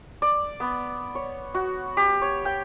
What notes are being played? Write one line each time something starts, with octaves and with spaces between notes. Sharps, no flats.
D5
B3
C#5
F#4
G4
C#5
G5